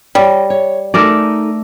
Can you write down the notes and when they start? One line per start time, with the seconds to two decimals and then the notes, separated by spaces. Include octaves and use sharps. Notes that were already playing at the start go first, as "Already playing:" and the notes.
0.15 G3 C#5 D#5
0.50 C#5
0.94 A3 D#4 A4 A#4 D5 G#5